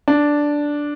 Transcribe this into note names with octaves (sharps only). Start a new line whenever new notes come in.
D4